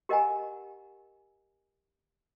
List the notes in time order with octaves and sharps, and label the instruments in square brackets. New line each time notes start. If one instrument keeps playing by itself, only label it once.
[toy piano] G4 A#4 D#5 F#5 G#5 A#5